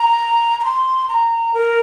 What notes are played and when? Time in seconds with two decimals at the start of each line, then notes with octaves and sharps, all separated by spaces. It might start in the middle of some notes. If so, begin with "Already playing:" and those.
Already playing: A#5
0.60 A#5
0.64 C6
1.08 A#5
1.54 A#4